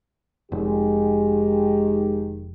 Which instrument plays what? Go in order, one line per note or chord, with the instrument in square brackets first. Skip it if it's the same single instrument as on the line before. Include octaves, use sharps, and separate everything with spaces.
[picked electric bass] F1 [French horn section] D#3 G#3 G4